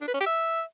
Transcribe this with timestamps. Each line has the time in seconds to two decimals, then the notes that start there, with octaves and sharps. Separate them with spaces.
0.01 D4
0.08 B4
0.14 C#4
0.20 G4
0.27 E5